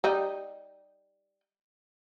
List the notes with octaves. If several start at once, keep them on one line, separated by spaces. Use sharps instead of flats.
G3 D#4